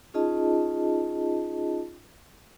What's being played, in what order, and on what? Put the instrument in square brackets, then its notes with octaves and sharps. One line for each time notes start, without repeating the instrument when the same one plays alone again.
[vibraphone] C#4 D#4 F4 G#4 D#5 A5